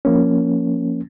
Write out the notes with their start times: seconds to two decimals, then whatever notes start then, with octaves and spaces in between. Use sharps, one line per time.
0.05 F3 A#3 C#4